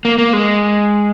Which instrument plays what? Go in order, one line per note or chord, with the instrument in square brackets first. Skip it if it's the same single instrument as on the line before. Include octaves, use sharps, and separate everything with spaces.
[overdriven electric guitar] A#3
A#3
G#3